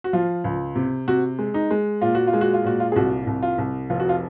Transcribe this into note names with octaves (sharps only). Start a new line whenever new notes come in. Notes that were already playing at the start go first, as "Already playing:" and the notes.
F#4
F3 F4
C#2
C3
C3 F#4
G#3
D#4
G#3
A#2 F4
F#4
F4
G#3
F#4
F4
A#2 F#4
F4
G#4
C2 F#4
C2
F4
C2
F1 F4
F#4
F4